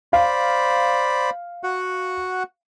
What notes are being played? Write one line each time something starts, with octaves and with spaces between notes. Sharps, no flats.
C5 D5 F5 B5
F#4 F#5